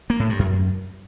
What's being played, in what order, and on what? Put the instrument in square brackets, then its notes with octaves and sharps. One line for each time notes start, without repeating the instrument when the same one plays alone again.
[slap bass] A#3
A2
G2
F#2